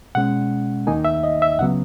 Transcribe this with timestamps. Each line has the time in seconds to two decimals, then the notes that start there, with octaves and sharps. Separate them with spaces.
0.15 B2 G#3 C#4 F#5
0.87 D#2 D#3 A#3 D#4 G#5
1.05 E5
1.23 D#5
1.42 E5
1.59 C#2 C#3 F#3 B3 F#5